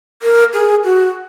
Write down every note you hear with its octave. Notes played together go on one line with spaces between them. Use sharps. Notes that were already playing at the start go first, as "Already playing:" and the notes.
A#4
G#4
F#4